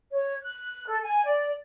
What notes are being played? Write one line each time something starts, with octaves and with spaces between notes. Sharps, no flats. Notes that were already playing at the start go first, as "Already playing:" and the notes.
C#5
F#6
A4
G#5
D5